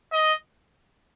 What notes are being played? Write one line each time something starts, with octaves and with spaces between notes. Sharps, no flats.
D#5